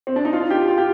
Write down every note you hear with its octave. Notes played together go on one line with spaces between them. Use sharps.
C4
D4
D#4
F4
G4
F4
G4